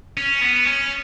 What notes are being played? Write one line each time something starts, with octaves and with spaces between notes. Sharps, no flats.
C#4
B3
C#4